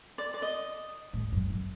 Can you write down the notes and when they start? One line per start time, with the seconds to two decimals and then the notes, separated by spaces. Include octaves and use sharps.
0.18 D5
0.34 D5
0.42 D#5
1.13 G#2
1.32 F#2
1.50 F#2